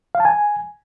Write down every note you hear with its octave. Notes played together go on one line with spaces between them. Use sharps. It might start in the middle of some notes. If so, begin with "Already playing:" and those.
F5
A5
G#5